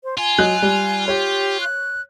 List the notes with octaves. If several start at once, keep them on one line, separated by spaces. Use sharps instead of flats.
C5
F4 G#5
F#3 D#5 F#6
G3
G4 C#5
F#6